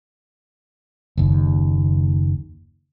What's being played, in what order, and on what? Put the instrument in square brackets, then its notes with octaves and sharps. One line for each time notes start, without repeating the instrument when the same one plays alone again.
[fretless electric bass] F#1 D#2